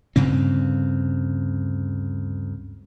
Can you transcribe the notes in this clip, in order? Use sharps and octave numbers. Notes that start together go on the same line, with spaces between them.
D2 G2 C#3 C4